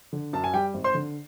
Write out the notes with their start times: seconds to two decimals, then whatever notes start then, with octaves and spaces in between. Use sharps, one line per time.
0.13 D3
0.33 F#2 A5
0.44 G#5
0.54 G3 G4 G5
0.74 G#1
0.84 C5 C6
0.94 D3